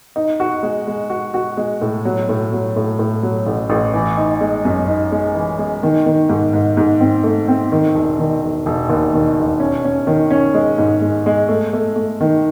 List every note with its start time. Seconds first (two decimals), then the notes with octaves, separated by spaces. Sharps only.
0.16 D#4
0.40 F#4
0.63 G#3
0.87 G#3
1.10 F#4
1.34 F#4
1.57 G#3
1.81 A2
2.05 F#3
2.29 A2
2.53 F#3
2.76 A2
2.99 A2
3.23 F#3
3.46 A1
3.70 A1
3.93 E3
4.17 D#4
4.41 G#3
4.65 F#2
4.88 D#4
5.12 G#3
5.35 E3
5.59 G#3
5.83 D#3
6.06 D#3
6.29 G#2
6.53 G#2
6.77 G#2
7.01 C4
7.24 A3
7.48 C4
7.72 D#3
7.95 E1
8.19 D#3
8.42 E1
8.66 E1
8.89 D#2
9.13 D#3
9.37 E1
9.60 C#4
9.84 C#4
10.07 D#3
10.30 C#4
10.54 G#3
10.78 G#2
11.01 G#3
11.26 G#3
11.48 A3
11.73 A3
11.96 A3
12.21 D#3